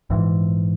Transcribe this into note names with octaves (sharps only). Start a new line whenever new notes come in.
A#1 G#2 E3